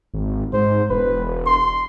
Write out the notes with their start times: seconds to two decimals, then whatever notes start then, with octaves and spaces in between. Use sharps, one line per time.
0.14 G#1
0.53 G#2 C5
0.90 E1 B4
1.47 C6